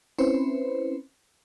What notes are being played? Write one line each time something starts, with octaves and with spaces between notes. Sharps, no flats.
C4 C#4 E4 B4 C5